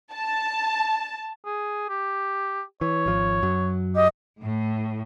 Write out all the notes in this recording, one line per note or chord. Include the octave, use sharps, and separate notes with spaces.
A5
G#4
G4
E3 C#5
G#1 F3
F#2 F#3
G4 D#5
A2